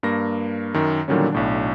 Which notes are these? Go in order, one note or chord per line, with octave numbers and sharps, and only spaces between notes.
G2 A#3 A#6
F#2 D#3
A#2 D3 D#3 F#3 G3 C#4
B1 A2 D4